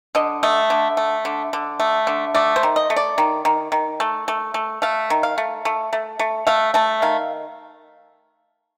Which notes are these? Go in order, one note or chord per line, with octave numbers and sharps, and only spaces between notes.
D3 D#5
A3 D#5
D3
A3
D3
D3
A3
D3
A3 D5
C5
D#3
D#5
A3
D5
D#3
D#3
D#3
A3
A3
A3
A3 F5
D#3
F5
A3
A3
A3
A3
A3 F5
A3 A5
D#3 F5